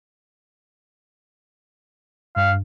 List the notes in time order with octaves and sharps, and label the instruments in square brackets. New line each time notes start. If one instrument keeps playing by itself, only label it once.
[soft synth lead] G2 [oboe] F5